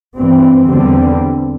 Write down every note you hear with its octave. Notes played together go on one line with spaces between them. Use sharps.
G2 E3 C4
E2 D3 G3 C4